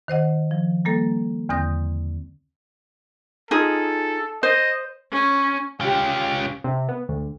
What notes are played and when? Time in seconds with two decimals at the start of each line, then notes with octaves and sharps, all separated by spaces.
0.08 D#3 C5 D#5 F#5
0.51 F3
0.85 G3 A#3 A4
1.49 E2 D3 C4 D#6 G6 A#6
3.51 D#4 F4 G#4 A4
4.43 C5 D#5
5.12 C#4
5.81 C#4 F4 G4
6.64 C3
6.89 B3
7.09 D2